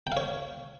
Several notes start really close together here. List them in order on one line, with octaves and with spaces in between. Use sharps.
G5 F5 C#5